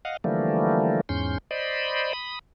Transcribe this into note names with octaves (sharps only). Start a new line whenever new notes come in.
D#5 F5 F#5
D3 E3 F3 G3 A3 A#3
E2 G#2 C#4 C6 G6
C5 D5 D#5 B5
B5 D#6